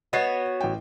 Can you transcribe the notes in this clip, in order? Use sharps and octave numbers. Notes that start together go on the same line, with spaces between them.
B3 F#4 C#5 D#5 A6 C7
A1 G5